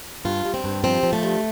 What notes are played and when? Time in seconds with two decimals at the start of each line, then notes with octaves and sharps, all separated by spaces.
0.25 G2 F4
0.45 G2
0.54 C4
0.64 G2
0.84 F3 C4
1.03 F3
1.13 A3
1.23 G2